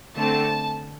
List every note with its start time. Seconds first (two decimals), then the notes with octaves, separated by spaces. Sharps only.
0.16 D3 A3 C4 A5